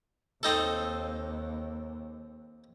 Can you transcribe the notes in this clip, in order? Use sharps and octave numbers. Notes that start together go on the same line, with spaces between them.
D#2 C4 D#4 A4